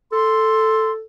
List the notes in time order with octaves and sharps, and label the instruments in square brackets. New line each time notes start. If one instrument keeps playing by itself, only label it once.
[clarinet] A4 [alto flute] C6